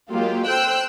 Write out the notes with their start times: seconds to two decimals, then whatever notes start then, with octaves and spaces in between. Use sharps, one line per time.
0.11 F#3 G#3 A#3 F4 G4
0.48 A4 C5 G5 E6 F#6 G6